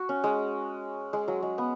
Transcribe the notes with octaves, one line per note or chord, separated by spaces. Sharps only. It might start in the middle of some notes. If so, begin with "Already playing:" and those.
Already playing: F#4
C#4
G#3
G#3
F#3
G#3
B3